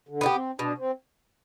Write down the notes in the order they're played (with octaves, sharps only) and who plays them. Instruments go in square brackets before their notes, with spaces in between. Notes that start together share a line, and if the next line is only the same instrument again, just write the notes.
[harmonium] D3
[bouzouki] B3 D#4 G4
[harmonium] C4
[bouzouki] B2 [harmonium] D4
[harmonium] C4